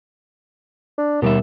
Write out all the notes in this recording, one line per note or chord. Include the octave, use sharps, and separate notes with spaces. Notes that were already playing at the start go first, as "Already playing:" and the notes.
D4
D#2 B2 G3 E5